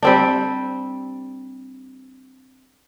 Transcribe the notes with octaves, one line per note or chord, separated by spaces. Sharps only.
G3 C4 D4